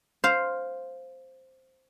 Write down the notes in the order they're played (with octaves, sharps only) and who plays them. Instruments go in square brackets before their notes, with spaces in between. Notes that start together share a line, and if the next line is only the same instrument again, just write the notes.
[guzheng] C5 F5